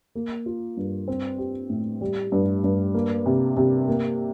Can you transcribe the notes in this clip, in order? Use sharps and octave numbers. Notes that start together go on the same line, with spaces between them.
A#3
F4
G2
C4
G4
A2
G3
G2
G2
A#3
C3
C3
A#3